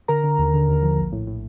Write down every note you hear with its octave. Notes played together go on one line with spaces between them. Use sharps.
D3 A#4 A#5
D3
D#2
D3
D#2
F3
A#1
A2
A2